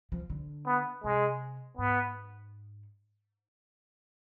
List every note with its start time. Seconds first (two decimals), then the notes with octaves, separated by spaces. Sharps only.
0.12 F3
0.30 D3
0.67 B3
1.04 C3 G#3
1.77 G#2 B3